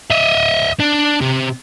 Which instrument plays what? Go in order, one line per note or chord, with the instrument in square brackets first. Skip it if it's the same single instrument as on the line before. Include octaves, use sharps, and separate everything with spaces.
[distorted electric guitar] D#5 E5
D4
C3